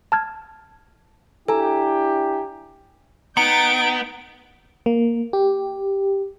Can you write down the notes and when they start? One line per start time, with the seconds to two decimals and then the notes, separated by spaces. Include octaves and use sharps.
0.12 A5 F6 G#6
1.48 D4 E4 G4 A4 G#5 A#5
3.37 B3 D#4 G5 A#5 C#7 D7
4.86 A#3
5.33 G4